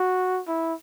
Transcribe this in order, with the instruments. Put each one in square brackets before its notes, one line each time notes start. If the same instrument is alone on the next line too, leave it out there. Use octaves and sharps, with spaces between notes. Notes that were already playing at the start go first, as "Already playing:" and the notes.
Already playing: [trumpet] F#4
E4